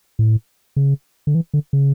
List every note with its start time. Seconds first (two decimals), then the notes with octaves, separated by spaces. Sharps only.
0.19 A2
0.76 C#3
1.27 D3
1.35 E3
1.54 D3
1.73 C#3